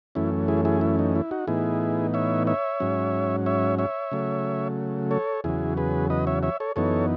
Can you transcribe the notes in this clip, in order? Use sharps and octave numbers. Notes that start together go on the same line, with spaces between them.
F#2 E3 A3 C#4 E4
E4 G#4
E4 G#4
E4
D#4
E4
D#4 F#4
A2 E3 B3 D#4 E4 G#4
C#5 E5
C#5 E5
G#2 F#3 C#4
C#5 E5
C#5 E5
C#3 F#3 A3
A4 C#5
E2 C#3 F#3 E4 G#4
G#4 B4
B4 D#5
C#5 E5
C#5 E5
A4 C#5
F#2 E3 B3 D#4 A4 C#5